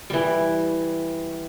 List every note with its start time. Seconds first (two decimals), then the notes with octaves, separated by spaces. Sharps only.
0.10 E3 G3